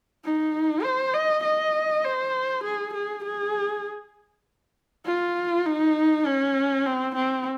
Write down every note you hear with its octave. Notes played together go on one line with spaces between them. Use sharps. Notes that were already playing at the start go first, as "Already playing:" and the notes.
D#4
C5
D#5
D#5
C5
G#4
G#4
G#4
F4
D#4
C#4
C4
C4